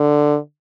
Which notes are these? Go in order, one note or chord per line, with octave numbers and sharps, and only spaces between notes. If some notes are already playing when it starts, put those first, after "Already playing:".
Already playing: D3